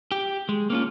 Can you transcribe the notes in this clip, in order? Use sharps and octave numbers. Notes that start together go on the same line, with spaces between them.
G4
G#3
A#3 C#4 F4